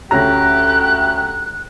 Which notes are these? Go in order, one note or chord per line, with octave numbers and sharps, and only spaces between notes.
D2 C#4 G4 A#5 F#6 A#6